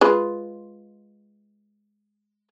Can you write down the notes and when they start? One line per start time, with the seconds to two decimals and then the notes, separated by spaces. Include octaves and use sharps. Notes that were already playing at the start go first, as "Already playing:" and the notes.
0.01 G#3 F4 B4